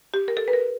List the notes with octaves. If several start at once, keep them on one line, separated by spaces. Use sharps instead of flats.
G4
A#4
A4
B4
A#4